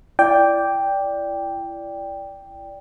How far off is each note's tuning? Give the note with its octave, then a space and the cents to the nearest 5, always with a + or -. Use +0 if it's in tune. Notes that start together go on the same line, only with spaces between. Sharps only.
E4 +30 D5 -10 G5 +5